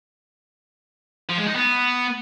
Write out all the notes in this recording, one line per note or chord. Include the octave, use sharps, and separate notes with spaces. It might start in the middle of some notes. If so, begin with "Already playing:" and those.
F3
G#3
D#4
B3